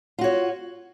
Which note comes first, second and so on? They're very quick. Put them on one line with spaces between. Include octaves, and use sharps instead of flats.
F4 F#4 C#5